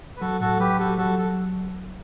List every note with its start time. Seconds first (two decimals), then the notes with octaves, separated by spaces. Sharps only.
0.17 B4
0.21 F#3 F#4 A4
0.41 A2 F#4 A4
0.60 F#3 G4 B4
0.79 F#4 G4 A4
0.98 F#3 F#4 A4
1.18 F#3 A4